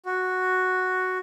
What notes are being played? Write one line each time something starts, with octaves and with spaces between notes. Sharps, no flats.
F#4